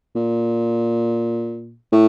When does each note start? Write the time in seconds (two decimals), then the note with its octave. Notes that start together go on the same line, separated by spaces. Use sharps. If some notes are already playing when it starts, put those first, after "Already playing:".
0.15 A#2
1.92 A2